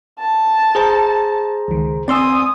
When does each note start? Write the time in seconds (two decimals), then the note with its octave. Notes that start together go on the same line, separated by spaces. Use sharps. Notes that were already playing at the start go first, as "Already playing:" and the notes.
0.20 A5
0.75 G#4 C5 A#5
1.68 C#2 D#3
2.08 C4 D5 G#5 C6 D#6 E6